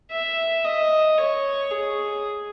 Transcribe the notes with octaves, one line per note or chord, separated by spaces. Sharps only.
E5
D#5
C#5
G#4